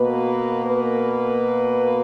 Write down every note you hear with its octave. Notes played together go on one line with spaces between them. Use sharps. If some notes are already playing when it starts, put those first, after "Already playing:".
Already playing: B2 A#3 B4
B4